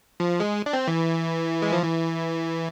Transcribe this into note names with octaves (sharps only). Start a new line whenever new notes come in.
F3
G#3
D4
C4
E3
G#3
F3
E3